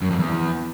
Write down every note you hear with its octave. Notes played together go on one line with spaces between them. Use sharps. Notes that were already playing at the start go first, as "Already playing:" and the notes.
F#2
F2
E2